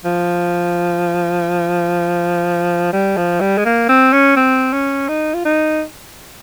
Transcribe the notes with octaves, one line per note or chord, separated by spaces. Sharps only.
F3
G3
F3
G3
G#3
A#3
C4
C#4
C4
C#4
D#4
F4
D#4